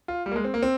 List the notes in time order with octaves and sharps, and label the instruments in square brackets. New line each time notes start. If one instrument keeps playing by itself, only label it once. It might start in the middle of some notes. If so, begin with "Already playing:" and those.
[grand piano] F4
G3
A#3
G#3
C4
A#3
C4